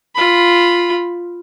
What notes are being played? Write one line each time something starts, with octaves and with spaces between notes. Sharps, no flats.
F4 B5